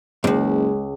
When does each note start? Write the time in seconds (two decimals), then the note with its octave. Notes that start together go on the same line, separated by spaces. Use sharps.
0.24 F#1 C#2 F#2 G#3